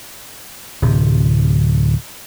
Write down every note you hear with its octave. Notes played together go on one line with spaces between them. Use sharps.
D1 C3